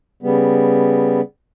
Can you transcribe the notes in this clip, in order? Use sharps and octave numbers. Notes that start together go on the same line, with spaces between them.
C#3 G3 B3